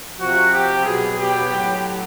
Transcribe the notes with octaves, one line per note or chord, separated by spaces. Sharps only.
C3 F3 F#4
G4
B2 F#3 G#4
G4
A2 F#3